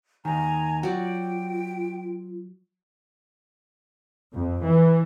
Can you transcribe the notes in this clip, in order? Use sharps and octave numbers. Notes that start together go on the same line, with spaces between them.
D#2 D#3 G#5 A#5
F#3 F4 F#4 D5 G5
F2
E3